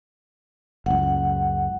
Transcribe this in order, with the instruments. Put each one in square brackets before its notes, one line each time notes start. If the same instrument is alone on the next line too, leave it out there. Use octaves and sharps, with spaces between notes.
[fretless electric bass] F#1 C#2 [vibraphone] F#5